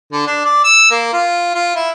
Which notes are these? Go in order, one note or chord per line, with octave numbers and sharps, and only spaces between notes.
D3
D4
D5
E6
A#3
F4
F4
E4